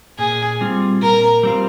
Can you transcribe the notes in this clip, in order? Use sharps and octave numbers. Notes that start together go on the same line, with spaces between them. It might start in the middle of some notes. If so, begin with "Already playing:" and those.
A#2 G#4
G3 C4 F4
A#2 A#4
G3 C4 F4